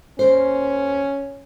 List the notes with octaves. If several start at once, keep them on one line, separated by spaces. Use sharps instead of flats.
D#2 C#4 A#4 C5